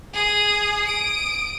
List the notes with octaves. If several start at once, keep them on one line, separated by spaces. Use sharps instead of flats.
G#4 D#6
D#6 D7